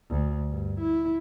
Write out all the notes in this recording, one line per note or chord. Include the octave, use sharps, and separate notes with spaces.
D2
G2
E4